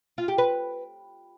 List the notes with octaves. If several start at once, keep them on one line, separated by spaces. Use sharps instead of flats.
F4
G4
B4